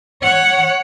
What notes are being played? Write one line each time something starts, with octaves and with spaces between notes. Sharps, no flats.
C#5 F#5